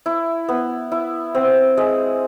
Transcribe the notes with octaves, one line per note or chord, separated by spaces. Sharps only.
E4
B3
E4
C4
G#3